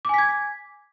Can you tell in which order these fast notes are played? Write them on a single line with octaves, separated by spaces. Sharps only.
D6 G#5 B6 G#6